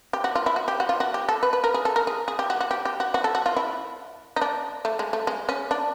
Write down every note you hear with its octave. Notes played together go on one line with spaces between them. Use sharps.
G4
F#4
F4
E4
F#4
G4
F#4
F4
F#4
G4
A4
B4
B4
A#4
G#4
A4
A#4
G#4
G#4
G4
F#4
F#4
G4
G4
F#4
F#4
A4
F#4
F4
E4
D#4
D4
A3
G#3
A3
G#3
C#4
D4